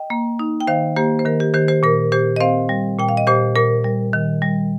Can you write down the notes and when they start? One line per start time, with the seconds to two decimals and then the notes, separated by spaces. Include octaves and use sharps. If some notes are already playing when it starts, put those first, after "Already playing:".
Already playing: D#5 G5
0.10 A#3
0.39 D#4
0.61 G5
0.67 D#3 C5 F5
0.96 A#3 G4 C5
1.19 C5
1.25 D#3 A#4
1.40 G4
1.54 D#3 G4 C5
1.68 G4 C5
1.83 A#2 A#4
2.12 A#2 G4 C5
2.36 D#5
2.41 C4 C5 F5
2.69 G3
2.99 A#2 G5
3.09 F5
3.17 D#5
3.27 A#2 G4 C5
3.56 A#2 A#4
3.84 G3
4.13 D#3
4.42 G3